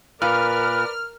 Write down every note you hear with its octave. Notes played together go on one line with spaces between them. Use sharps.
A#2 A#4 B4 D5 F6